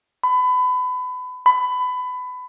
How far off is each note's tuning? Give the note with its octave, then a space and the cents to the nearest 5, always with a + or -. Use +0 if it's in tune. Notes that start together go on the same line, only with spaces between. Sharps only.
B5 +30
B5 +25